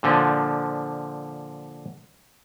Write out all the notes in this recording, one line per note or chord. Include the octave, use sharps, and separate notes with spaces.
A#2 D3 F3